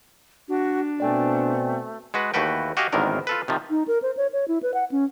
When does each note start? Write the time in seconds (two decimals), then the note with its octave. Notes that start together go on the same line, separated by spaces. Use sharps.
0.48 D4 F#4
1.00 B2 A3 C4 D5 G5 G#5
2.14 G#3 F#4 B4
2.34 D#2 E3 A3 F#4 B4 G5
2.77 F#4 G4 D#5 F5 G#5
2.93 G#1 E2 A2 D3 D#3 A#4
3.27 F4 A4 B4
3.48 C3 D#3 F3
3.69 D#4
3.88 A#4
4.02 C5
4.17 C#5
4.33 C#5
4.48 E4
4.63 B4
4.74 F#5
4.92 C#4